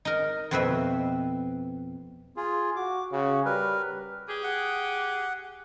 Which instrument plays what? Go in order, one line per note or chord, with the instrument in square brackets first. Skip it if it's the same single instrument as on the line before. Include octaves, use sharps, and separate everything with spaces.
[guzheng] D#4 A#4
F2 B2 C4 B4 C5 E5
[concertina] F4 G#4
[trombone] F#4 [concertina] D6
[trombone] C#3 [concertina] F#4
[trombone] G3 [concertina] A#4 B4
[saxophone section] G4 G#4
[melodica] F#5